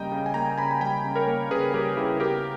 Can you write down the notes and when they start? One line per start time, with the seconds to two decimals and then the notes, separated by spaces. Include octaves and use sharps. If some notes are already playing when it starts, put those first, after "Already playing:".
Already playing: C#3 G3 A#3 D#5 G5 A#5
0.12 C#3
0.26 G#5
0.34 A#3 G5 A#5
0.58 C#3 G#5 B5
0.71 B5
0.81 G3 G5 A#5
1.04 C#3
1.16 A#4 C#5
1.27 A#3
1.50 C#3 G#4 B4
1.74 G3 G4 A#4
1.97 C#3 E4 G#4
2.20 B3 G4 A#4